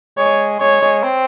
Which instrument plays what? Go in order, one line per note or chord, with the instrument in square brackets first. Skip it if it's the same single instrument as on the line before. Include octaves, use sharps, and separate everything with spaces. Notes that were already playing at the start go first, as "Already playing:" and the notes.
[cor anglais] G#3 [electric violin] C#5
[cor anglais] G#3 [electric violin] C#5
[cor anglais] G#3
C4